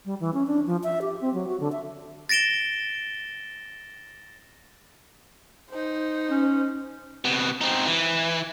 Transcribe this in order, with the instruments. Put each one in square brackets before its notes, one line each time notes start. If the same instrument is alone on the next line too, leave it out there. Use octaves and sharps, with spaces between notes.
[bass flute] G3
E3
C#4
D4
F3
E5
G4
C4
F#3
F#4
D3
E5
[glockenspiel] A6 A#6 D7 E7 G7
[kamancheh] D#4 C5
[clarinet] C#4
[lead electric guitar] C3 B3
C4 D#4
E3